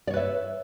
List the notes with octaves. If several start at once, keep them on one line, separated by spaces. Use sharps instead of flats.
B4 C#5 D5 E5